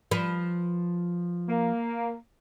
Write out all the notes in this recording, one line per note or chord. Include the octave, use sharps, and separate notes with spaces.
F3 B4
A#3